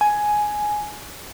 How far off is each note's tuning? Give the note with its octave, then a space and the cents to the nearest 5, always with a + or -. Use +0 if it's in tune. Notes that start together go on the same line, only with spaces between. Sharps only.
G#5 +10